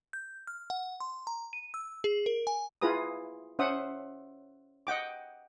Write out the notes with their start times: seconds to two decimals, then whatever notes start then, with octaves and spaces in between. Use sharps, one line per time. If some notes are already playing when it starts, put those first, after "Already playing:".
0.13 G6
0.47 F6
0.70 F#5
1.00 C6
1.27 A#5
1.53 D#7
1.74 E6
2.04 G#4
2.26 A#4
2.47 G#5
2.82 E4 F4 G#4 B4 A#5 D#6
3.59 C#4 C5 E5 F#5 D#6
4.87 D#5 F#5 G5 D6